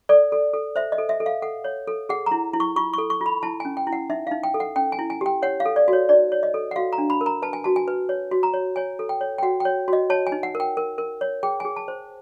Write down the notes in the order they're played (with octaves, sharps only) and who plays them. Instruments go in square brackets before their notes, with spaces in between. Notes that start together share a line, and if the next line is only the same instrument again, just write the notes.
[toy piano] A4 D5
A4
A4
C5 E5
D#5
A4
E5
A4
F5
A4 F#5
C#5
A4
G#4 F#5
E4 A#5
E4
C#6
F4 C#6
A4 C#6
C#6
F4
B5
E4 A5
C#4 G#5
G5
E4
F#5
D#4 E5
D#4 F5
G5
A4
F#5
C#4 G5
G#5
E4
G#5
G4 G5
C#5 F#5
F5
A4
D5
F#4
C#5
D#4 D5
C#5
D#5
A4
F#5
F#4 F5
A#5
D4
B5
A#4
A#5
B4 A5
G#5
F#4 A5
G#5
B4
C#5
F#4
A#5
C#5
C#5 G#5
A4
G5
C#5
G5
F#4 F#5
C#5 G5
F#4 D#5
C#5 A5
G#5
D#4
F#5
A#4
G5
A#4
A#4
C#5
G#4 G5
G#4 G#5
A5
C5